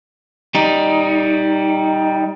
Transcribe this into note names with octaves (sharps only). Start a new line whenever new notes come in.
G3 D#4